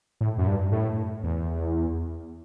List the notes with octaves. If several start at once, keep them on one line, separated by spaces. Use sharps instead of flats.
A2
F#2
G2
A2
E2